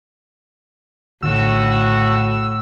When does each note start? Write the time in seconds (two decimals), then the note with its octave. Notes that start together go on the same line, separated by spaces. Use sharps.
1.23 A#1 A2 D3 D#3 F#4 E6